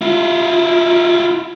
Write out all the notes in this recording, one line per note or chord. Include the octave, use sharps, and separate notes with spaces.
E4 F4